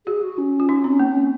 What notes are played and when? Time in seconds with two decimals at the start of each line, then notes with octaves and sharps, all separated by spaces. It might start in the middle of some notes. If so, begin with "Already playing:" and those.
0.06 F#4 G#4
0.22 F#4
0.38 C#4
0.60 F4
0.69 D#4
0.84 C4
0.99 A#3